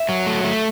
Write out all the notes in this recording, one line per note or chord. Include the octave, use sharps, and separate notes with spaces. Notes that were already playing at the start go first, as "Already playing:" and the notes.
Already playing: E5
F#3
A3
A3